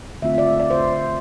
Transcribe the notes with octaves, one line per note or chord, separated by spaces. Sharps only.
D3 A3 C4 F4 E5
D5
D5
C5